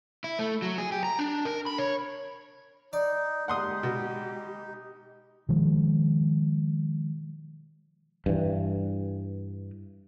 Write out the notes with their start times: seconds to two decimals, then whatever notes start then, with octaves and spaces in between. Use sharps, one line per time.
0.24 E4
0.39 A3
0.62 F#3
0.78 G#4
0.92 G4
1.04 A#5
1.19 D4
1.45 A#4
1.66 B5
1.78 C#5
2.93 D#4 D5
3.48 G#3 D#4 G4 F#5 C6 D#6
3.83 B2
5.49 B2 D#3 F3 G#3
8.26 G2 E3